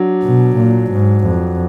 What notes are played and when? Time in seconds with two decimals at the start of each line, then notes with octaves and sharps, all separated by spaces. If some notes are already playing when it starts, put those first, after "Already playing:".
Already playing: F#3 D4
0.24 B2
0.57 A#2
0.91 G#2
1.25 F2